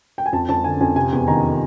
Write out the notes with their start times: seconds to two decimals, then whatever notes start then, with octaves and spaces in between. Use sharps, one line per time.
0.18 G5
0.26 G#5
0.33 F2 A5
0.49 F2 A5
0.64 D3 G#5
0.81 F2 G#5
0.96 C3 G#5
1.12 E2
1.28 D#3 A#5